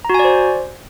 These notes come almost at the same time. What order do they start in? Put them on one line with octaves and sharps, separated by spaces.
A#5 F#4 G#5 D5 C5